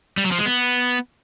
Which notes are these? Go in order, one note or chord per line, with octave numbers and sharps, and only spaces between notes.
G3
F#3
F3
G#3
B3